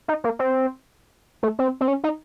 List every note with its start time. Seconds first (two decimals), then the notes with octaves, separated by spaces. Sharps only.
0.08 D#4
0.24 A#3
0.39 C4
1.43 A3
1.59 C4
1.81 C4
1.88 C#4
2.04 D#4